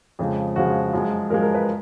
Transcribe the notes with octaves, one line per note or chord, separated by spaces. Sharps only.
F2 C#3 F3 G#3
F2 C#3 F3 G#3 F#4
F#2 F3 G#3
F#2 F3 G#3 A#4
A#4
B4